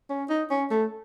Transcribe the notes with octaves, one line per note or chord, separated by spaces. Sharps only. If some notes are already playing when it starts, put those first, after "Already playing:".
C#4
D#4
C#4
A3